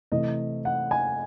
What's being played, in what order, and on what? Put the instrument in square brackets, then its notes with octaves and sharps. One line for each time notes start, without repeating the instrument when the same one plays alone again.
[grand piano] C3 E3 A3 D#5
F#5
G#5